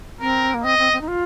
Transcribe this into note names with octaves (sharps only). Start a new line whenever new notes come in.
C4 A#4
A#3
C4 D#5
C4
C4
D#4
F4